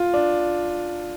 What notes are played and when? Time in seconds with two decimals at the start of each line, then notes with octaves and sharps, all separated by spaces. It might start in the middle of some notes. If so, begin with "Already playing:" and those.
Already playing: F4
0.14 D4